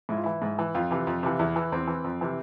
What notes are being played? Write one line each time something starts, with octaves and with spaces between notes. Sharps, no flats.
G#2 E4
F4
E3 E4
G#2
E3
F2 F4
C3 E3
F2
C3 E3
E2 E4
E3
E2 C4
E3
F2
C3 E3